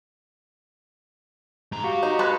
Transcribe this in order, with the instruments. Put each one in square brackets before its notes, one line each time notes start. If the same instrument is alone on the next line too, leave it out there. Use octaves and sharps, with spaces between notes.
[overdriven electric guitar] G#2 A#5
[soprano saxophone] F#4 [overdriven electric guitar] G4 [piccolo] F5
[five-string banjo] D#4
[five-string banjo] G#3 B4 A5 [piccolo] B5